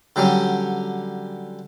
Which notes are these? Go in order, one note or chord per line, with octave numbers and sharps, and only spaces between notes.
D3 F#3 G3 C#4